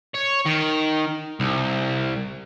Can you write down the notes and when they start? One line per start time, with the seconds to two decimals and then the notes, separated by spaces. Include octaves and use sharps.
0.14 C#5
0.45 D#3
1.40 C2